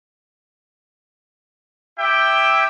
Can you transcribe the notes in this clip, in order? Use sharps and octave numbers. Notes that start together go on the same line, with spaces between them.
E4 G4 E5 G5